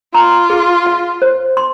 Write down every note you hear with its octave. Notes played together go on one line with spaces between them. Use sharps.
F4 A#5
G#4
F5
C5
C6